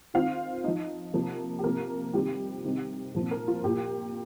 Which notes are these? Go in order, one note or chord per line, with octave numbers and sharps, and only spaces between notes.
D#3 C4 F4 F5
F3 D#4 D#5
C3 F3 A#3
G4
C3 F3 A#3 A#4
C3 D#3 G3 C4 F4 G4
C3 D#3 G3 C4 D#4
A#2 F3 C4
A#4
F4
A#2 A#3 F4 G4